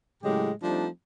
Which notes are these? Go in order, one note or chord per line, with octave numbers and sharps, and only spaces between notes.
A2 C#3 F#3 G#3 G4
F3 G3 A3 C4 D4 D#4